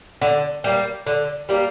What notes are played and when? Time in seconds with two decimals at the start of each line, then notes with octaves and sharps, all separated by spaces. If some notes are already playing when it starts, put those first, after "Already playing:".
0.22 D3
0.64 G3 A#3
1.07 D3
1.49 G3 A#3